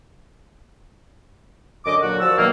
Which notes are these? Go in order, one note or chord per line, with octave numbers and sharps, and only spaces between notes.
F#2 D3 D#5 D6
A#2 D3 F#3 F#4
F3 F#4 A#4 D5 E6
B2 D#3 F#3 A#3